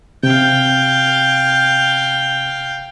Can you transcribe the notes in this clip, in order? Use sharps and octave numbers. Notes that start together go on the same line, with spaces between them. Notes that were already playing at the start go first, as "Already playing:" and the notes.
C3 F5 G5